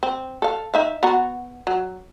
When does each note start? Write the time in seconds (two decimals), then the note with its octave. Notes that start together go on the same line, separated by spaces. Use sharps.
0.03 C4
0.42 A4 F5
0.74 D#4 E5 F5
1.03 B3 F#4 A#5
1.67 F#3